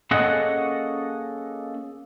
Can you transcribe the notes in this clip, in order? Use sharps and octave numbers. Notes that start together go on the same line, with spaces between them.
A#3 C#4 G#4 A4 D#5 F#5